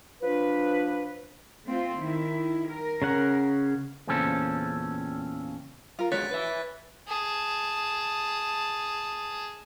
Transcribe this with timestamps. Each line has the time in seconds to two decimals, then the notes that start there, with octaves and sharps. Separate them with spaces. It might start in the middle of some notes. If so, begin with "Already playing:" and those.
0.22 F3 D4 F4 B4
1.67 A3 C4 F4
2.01 D#3 E4
2.69 A#4
3.02 C#3 C#4 F#5
4.07 E2 A#2 C#3 C4 C#4 A4
5.99 F4 A#4
6.12 D3 G#3 F#4 C#5 F#6 A6 B6
6.31 B4 E5
7.07 G#4 A5